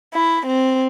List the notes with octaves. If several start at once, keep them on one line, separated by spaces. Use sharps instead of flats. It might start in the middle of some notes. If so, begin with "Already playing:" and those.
E4
C4